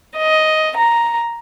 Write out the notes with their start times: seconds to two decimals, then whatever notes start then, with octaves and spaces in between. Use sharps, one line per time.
0.18 D#5
0.79 A#5